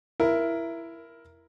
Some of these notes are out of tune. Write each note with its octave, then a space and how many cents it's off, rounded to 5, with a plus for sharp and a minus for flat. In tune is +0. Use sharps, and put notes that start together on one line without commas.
E4 +15 A#4 +10